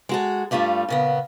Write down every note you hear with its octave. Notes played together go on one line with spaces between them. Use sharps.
G#3 F#4 A4
G2 G3 A3 F4 A4
A#2 C#3 B3